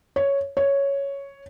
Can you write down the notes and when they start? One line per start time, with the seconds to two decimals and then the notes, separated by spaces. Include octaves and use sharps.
0.16 C#5
0.57 C#5